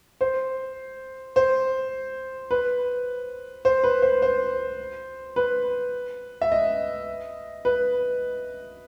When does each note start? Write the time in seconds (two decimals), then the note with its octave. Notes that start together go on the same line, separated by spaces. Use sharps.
0.21 C5
1.36 C5
2.51 B4
3.65 C5
3.84 B4
4.02 C5
4.22 C5
5.36 B4
6.41 E5
6.52 D#5
7.65 B4